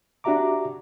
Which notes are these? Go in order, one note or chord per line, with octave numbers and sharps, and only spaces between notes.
D4 F#4 G4 E5 A#5 D6